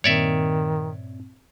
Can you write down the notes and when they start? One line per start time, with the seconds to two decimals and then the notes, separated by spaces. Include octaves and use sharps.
0.04 G2 A#2 D#3 C4 C#5 D5 E5